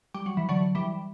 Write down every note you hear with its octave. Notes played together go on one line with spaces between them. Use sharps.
G3
F#3
E3
D3 F#3
E3 G3